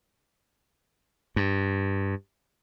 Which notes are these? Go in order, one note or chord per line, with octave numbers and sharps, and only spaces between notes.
G2